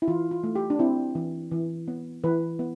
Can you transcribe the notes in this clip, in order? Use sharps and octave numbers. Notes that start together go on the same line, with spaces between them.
E4
E3 F4
F4
A3
G4
D4
C4 E4
E3
E3
B3
E3 B4
B3